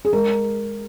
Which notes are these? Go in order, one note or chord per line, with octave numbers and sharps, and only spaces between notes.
G#4
G#3 A#4